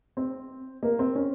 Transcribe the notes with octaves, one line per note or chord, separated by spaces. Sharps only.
C4
A#3
C4
C#4